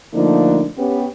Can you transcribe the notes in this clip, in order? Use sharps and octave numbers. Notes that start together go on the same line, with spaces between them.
D3 F3 A3 A#3 D4 D#4
B3 C#4 G4